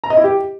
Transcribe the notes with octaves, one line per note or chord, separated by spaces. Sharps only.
A#5
D#5
E4
G4